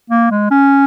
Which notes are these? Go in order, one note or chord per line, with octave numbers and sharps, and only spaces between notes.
A#3
G#3
C#4